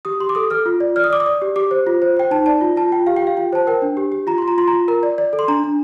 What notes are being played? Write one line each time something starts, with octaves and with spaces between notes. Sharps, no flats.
G4 D#6
G4 C6
D6
A4 D#6
A4 F6
F4
D5
D5 F6
D#6
D5 D6
D#6
D5
G4
G4 D6
C5
F4
C5
C5 G5
D#4 A5
D5 A5
F4
F4 A5
F4 G5
G4 F5
G5
G4 F5
F4 G5
C5 A5
A#4 G5
D4
G4
G4
F4 A#5
F4 C6
A#5
F4 C6
A#5
F4
A#4 A#5
D5
D5
A4
C6
D4 A#5
D4